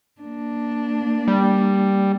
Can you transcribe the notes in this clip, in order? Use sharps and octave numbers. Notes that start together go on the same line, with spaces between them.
A#3 D4
G3